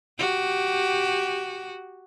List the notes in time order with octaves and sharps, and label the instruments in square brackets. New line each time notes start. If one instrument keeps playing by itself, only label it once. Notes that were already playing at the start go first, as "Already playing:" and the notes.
[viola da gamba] F#4 G4